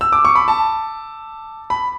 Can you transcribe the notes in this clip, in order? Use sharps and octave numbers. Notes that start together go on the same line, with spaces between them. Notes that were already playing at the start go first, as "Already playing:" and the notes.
E6
D6
C#6
B5
A5
B5